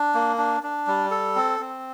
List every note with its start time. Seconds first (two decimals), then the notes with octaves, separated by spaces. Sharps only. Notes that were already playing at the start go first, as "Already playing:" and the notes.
Already playing: D4
0.14 A#3
0.38 D4
0.63 D4
0.87 G3
1.11 A4
1.36 C4
1.60 C4